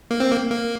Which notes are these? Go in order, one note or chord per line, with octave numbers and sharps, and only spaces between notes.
A#3
C4
A#3
A#3